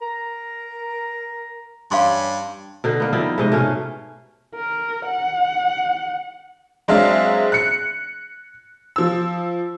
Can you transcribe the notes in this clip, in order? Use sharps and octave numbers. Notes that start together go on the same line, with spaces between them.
A#4 A#5
G2 C#4 F5 C6
B2 D3 D#4
A#3 B3
F3 G3 D#4 E4
G#2 C3 D#5
B2 A3 C#4 F5
A#4
F#5
F#3 G#3 C4 D4 E5 F5
F#6 C#7
F3 E6